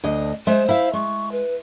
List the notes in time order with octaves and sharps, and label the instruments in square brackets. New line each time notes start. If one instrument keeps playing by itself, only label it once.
[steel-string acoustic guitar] D2 D4 D#5
[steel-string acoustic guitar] G#3 E5 [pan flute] C5
[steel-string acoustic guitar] E4 E5 F5
[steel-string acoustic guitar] G#3 [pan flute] C#6
[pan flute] B4